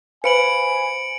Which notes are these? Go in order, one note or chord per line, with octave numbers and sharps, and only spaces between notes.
B4 C5 F5 G#5 B5 C#7 D7 F#7